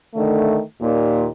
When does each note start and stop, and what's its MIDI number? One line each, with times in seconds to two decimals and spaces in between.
0.15 0.60 50
0.15 0.60 51
0.15 0.60 57
0.81 1.25 39
0.81 1.25 46